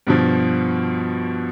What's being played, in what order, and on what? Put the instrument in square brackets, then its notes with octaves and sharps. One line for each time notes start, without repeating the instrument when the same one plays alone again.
[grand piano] G2 B2 F3